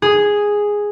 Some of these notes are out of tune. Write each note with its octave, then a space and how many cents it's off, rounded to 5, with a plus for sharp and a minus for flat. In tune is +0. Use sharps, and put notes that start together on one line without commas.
G#4 -5